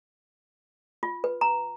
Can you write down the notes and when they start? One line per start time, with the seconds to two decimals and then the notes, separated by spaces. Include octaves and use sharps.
1.03 F4
1.24 B4
1.41 A#5